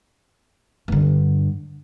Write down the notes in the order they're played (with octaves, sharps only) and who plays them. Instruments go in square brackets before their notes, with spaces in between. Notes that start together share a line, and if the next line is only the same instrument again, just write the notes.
[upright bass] G2 D3